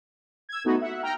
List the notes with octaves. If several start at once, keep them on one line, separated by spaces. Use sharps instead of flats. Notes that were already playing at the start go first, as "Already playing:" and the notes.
E6 G#6
A3 B3 D#4 F#4
E5 F#5
G5 A#5 F6